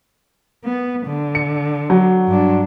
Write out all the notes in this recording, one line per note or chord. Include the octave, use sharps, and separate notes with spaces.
B3
D3
C#7
F#3
G2 D4